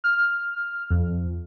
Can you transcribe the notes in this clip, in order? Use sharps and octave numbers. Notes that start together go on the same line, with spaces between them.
F6
F2